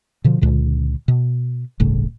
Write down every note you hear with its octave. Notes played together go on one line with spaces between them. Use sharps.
B2 D3 F3
C#2 A#2 D3
B2
D1 G1 A2 C#3